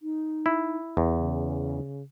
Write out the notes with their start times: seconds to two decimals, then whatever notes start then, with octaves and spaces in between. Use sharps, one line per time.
0.02 D#4
0.46 E4
0.97 E2
1.16 C#3